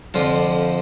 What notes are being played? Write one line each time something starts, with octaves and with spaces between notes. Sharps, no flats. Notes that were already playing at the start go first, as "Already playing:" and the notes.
F2 D3 F3 F4